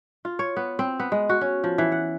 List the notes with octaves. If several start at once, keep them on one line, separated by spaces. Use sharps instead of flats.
F4
C#5
B3
C4
B3
G#3
F#4
C#4
F3
E3
F#5